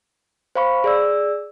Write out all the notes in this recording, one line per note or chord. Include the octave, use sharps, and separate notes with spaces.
C5 F5 B5 C#6
G#4 D5 E6